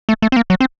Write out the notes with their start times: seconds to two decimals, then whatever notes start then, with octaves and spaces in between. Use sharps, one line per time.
0.09 A3
0.22 A3
0.32 C4
0.36 A#3
0.50 F#3
0.60 C4